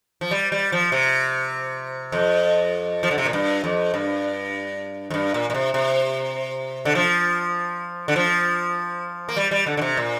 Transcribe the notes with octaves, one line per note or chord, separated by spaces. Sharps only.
F3
G3
G3
F3
C3
F2
F3
D3
C3
A#2
G2
F2
G2
F2
G2
A#2
A#2
C3
C3
D3
F3
D3
F3
A#3
G3
G3
D3
D3
C3
A#2